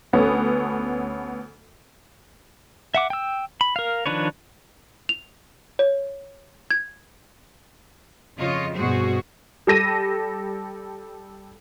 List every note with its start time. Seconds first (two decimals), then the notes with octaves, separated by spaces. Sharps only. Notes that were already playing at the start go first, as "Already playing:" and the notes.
0.13 D2 B3 C#4 A4
2.95 E5 F#5 D6
3.10 G5 E6
3.61 B5
3.76 A#4 F5
4.06 D#3 F3 D4 B4 C#5
5.09 F7
5.79 C#5
6.71 G#6
8.38 F2 C#3 F4 C#5 D#5
8.75 G2 B2 F#4 G#4 C5
9.67 G3 A4 A#6 D#7